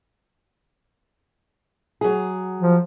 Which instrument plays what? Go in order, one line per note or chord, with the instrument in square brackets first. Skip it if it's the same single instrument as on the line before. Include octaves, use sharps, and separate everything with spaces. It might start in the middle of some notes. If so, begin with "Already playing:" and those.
[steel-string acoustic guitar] F#3 G#4
[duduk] F3